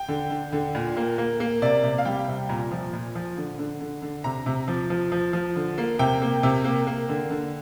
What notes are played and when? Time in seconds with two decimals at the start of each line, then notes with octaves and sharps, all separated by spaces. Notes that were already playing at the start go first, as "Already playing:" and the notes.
Already playing: G5
0.08 D3
0.30 D3
0.52 D3
0.75 A#2
0.97 A#3
1.18 A#3
1.40 A#3
1.62 C3 D5
1.83 C3
1.98 F5
2.05 G3 G5
2.28 C3
2.49 A#2 A#5
2.72 F3
2.93 A#2
3.15 F3
3.37 D3
3.59 D3
3.81 D3
4.02 D3
4.24 C3 A#5
4.46 C3
4.68 F3
4.90 F3
5.12 F3
5.33 F3
5.56 D3
5.78 A#3
5.99 C3 G5
6.22 A#3
6.43 C3
6.64 A#3
6.87 A#3
7.09 D3
7.30 D3